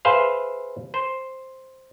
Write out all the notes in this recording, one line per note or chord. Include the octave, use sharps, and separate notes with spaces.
G#4 B4 C5 E5 F5
C5